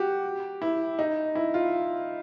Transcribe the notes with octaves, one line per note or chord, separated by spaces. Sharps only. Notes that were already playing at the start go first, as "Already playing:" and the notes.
Already playing: F#4 G4
E4
D#4
E4
F4